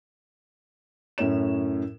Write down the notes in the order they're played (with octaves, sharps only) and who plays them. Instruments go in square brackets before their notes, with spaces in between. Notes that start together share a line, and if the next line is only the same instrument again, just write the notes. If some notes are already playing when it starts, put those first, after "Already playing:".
[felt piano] F#2 A2 C#4 C#5 E7